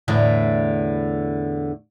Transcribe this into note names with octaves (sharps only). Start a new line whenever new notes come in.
E2 A2 D3